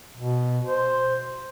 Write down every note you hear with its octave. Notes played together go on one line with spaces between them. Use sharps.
B2
C5